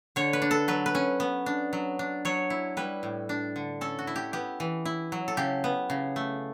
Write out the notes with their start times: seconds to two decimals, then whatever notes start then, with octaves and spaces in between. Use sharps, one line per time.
0.16 D3 C#5
0.33 B4
0.42 D4
0.51 A4
0.68 F#3 B4
0.86 B4
0.95 C#4
1.20 B3
1.46 D4
1.73 F#3
1.99 D4
2.25 F#3 C#5
2.50 E4
2.77 G3 B4
3.03 A2
3.29 D4
3.56 D3
3.81 C#4 A4
3.99 F#4
4.07 E4
4.16 G4
4.33 B3 G4
4.60 E3
4.85 E4
5.12 F#3
5.28 A4
5.37 C#3 G4
5.64 B3
5.90 C#3
6.16 A3